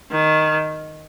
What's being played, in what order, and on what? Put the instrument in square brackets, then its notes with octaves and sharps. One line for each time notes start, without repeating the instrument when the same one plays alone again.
[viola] D#3